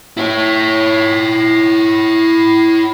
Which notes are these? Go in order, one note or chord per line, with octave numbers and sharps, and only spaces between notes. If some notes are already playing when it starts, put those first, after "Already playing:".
E4 C#5